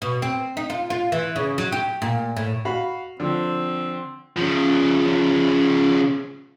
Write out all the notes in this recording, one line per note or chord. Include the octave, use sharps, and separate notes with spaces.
B2
C4
D#4
F4
F4
E3
C#3
F#3
G4
A#2
A2
F#4 F5 B5
D3 F3 C4
C#3 F3